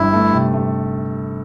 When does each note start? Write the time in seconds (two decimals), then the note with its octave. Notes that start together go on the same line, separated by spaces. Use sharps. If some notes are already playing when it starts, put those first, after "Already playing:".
Already playing: G1 G2 E4
0.13 A3
0.33 C3
0.54 A3